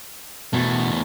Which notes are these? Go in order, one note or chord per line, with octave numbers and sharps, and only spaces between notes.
E2 B2 A3